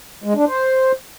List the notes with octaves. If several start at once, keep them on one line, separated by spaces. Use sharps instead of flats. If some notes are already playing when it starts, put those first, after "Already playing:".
G#3
D4
C5